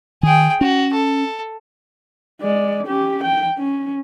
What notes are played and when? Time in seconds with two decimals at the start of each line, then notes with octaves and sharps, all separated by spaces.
0.23 D#3 G#4 G5
0.61 C#4 F#4
0.93 A4
2.41 G#3 D5
2.86 C#4 G4
3.23 G5
3.58 C#4